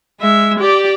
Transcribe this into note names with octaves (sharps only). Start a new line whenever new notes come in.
G#3 E5
G4 D5